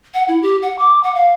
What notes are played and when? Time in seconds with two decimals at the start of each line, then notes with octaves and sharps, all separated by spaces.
0.14 F#5
0.28 E4
0.42 G4
0.62 F#5
0.79 D6
1.03 F#5
1.15 F5